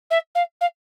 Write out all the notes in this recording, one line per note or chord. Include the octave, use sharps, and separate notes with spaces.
E5
F5
F5